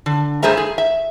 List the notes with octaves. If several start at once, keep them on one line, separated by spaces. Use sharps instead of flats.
D3
G2 A3 G#4 C5 E5 A#5
G#4
E5